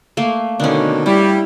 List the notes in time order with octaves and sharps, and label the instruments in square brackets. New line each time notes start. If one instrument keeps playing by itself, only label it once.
[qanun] A3 A#3
[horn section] B2 D3 D#3 [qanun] C#4 D4
[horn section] G3 [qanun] E4